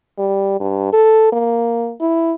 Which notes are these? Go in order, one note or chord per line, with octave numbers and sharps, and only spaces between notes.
G3
G2
A4
A#3
E4